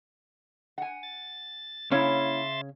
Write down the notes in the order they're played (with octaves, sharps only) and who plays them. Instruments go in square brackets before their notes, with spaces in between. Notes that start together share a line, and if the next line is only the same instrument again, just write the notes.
[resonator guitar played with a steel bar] F#5 G#5
[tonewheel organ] A6
[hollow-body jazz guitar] C#3 C#4 [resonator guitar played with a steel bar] A#3 E4 [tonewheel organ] E5 C6 A6